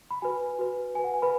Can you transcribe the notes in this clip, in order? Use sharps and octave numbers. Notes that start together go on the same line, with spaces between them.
B5
F#4 B4 G#5
F#4 B4
F#4 B4 G#5
F#5
G#5
B4 B5